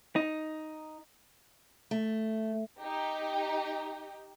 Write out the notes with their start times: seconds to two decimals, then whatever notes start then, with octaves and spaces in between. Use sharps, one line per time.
0.16 D#4
1.91 A3
2.80 D#4 G4